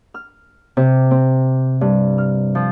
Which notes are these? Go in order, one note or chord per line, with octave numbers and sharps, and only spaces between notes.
F6
C3
C4
G2
F6
F3